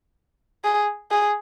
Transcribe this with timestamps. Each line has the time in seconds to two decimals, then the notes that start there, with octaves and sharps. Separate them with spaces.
0.64 G#4
1.11 G#4